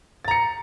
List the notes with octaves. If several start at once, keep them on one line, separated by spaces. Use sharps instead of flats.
A#5 A6 C#7